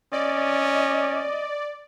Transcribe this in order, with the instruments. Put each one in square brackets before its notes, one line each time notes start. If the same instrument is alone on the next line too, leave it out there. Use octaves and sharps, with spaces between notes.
[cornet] C#4 [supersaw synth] D5 [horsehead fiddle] D#5